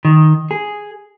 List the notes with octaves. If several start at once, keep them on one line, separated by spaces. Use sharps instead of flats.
D#3
G#4